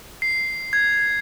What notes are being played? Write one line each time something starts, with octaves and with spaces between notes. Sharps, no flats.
C7
G#6